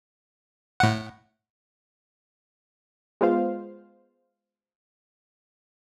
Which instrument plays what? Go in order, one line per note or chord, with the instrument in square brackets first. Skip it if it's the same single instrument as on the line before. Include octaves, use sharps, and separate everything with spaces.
[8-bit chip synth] A2 F#5
[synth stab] G#3 B3 F4 C5 F5